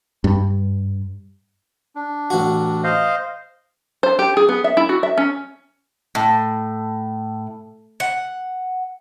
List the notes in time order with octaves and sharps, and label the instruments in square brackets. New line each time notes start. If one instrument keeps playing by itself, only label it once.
[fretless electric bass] G2
[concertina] D4
[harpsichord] A1 F#4
[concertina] C5 D#5 F5
[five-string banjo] C5
G4
G#4
B3
E5
E4
F#4
E5
C#4
[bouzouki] A2
F#5